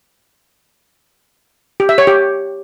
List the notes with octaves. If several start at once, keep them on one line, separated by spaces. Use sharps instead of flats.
G4
E5
C#5
G4